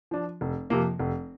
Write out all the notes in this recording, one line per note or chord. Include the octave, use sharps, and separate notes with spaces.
F3 D4
F1
F2 C3 F3 A#3
F1